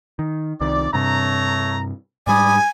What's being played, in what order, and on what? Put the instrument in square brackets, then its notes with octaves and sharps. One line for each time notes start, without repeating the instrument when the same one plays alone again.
[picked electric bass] D#3
[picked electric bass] C2 C3 D#3 [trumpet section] D5
[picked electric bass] G2 C3 [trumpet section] A3 C#5 A#5
[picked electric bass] G#2 G3 [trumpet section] D5 B5 D#6 [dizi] G#5